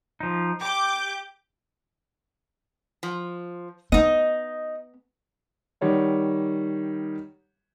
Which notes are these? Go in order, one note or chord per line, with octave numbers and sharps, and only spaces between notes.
F3 D#4
G4 D6 G6
F3
B3 D#4 D#5
D#3 G3 C#5 F#5